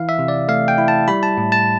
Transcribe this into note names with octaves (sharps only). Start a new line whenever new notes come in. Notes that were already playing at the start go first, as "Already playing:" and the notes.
Already playing: E3 E4 F5
E5
C3
D5
A3 F5
G5
E4
A5
G3 B5
A5
A2
A5